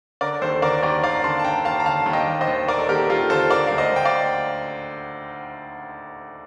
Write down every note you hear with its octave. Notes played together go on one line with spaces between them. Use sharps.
D3 A#4 D5
D#2 A4 C5
D3 A#4 D5
D#2 A#4 D5
D#2 D5 F5
A#5
D3 A5 C6
A5
D3 G5 A#5
D#2 F5 A5
A#5
D3 F5 A5
D#2
D#5 G5
D#2
C5 D#5
D#2
D#2 A#4 D5
A4
D#2 G4 A#4
D#2 F4 A4
D3 A4 C5
D3 A#4 D5
D2 F5
C5 D#5
D2 G5
D5 F5